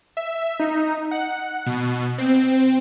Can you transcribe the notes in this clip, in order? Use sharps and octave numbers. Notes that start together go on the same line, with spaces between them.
E5
D#4
F#5
B2
C4